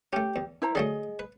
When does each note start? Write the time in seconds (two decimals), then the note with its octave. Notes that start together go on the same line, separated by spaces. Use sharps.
0.13 A3 C#4 G4
0.36 E2
0.62 E4 C5 A#5
0.75 D3 F#3 A3 G#4 D#5
1.19 B4